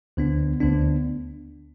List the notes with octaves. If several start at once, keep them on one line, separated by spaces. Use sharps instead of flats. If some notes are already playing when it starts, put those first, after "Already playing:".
D2 D3 B3 D4
D2 D3 B3 D4